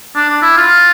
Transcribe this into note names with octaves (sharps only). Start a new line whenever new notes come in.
D4
D4
E4
F4